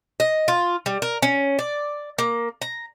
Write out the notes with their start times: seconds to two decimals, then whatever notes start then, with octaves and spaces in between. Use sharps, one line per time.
0.20 D#5
0.48 F4
0.86 G3
1.02 A#4
1.22 C#4
1.59 D5
2.18 A#3
2.62 A#5